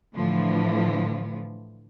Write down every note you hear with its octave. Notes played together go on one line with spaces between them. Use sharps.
A2 D3 E3 F3